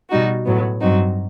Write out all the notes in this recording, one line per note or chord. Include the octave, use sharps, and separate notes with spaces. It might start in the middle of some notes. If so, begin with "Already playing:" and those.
B2 G3 D#4 F#4
A2 F#3 B3
G2 F#3 C4 D#4 F#4